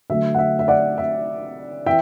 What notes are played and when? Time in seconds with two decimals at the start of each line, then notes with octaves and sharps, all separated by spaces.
0.10 D3 F#3 A3 E5
0.34 F#5
0.38 E5
0.59 E5
0.68 D5 F#5
0.98 E5
1.86 E3 E5 G5